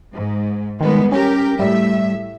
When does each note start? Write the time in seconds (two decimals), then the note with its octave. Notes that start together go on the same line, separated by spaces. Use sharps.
0.13 G#2
0.81 D#3 G3 G#3 B3
1.12 C#4 G4 A#4
1.59 A2 G3 E5